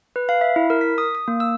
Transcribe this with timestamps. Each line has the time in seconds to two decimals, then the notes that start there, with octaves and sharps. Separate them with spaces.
0.16 B4
0.29 F5
0.41 E5
0.56 E4
0.70 A#4
0.81 B6
0.98 D#6
1.15 D#6
1.28 A#3
1.40 E6